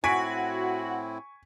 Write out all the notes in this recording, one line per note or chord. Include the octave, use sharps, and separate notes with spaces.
A2 C4 E4 F#4 G#5 C#6 B6 D7